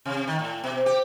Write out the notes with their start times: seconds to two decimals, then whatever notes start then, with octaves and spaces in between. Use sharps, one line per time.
0.06 C3
0.27 D#3
0.39 A2
0.64 B2
0.86 G4